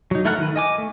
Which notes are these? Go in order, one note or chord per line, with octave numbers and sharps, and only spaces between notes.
F#3 D#4
A3 E4 A4 A#4 F#5
D#3 B4
D#5 G#5 D6
A3